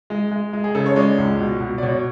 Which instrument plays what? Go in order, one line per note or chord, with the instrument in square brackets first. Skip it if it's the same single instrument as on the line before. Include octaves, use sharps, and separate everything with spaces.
[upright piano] G#3
G#3
G#3
G#4
C#3 A4
C#5
G#3 D5
C#2
B2
B2
D5
B2 C#5